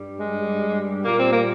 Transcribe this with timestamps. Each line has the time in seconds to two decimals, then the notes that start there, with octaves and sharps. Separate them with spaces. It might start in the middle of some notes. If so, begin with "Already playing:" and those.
Already playing: G2 G3
0.19 G#3
1.05 A#2 G3 A#3
1.18 C4
1.30 A#3